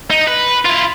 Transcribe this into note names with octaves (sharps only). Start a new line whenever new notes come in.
D#4
B4
E4 F4